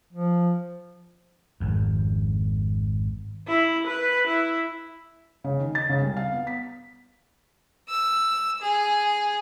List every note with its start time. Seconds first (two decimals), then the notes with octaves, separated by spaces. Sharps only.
0.13 F3
1.60 G#1 F2
3.47 E4
3.87 B4
4.27 E4
5.44 C#3
5.59 D#3
5.75 A6
5.89 C#3
6.01 C2
6.17 F5
6.33 B3
6.47 B6
7.89 E6
8.62 G#4